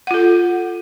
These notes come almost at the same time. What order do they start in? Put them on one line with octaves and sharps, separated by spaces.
F#5 F4 A4